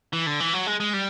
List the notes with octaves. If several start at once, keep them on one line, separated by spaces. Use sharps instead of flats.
E3
D3
E3
F#3
G#3
G#3
G3